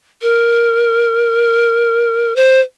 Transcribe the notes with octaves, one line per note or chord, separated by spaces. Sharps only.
A#4
C5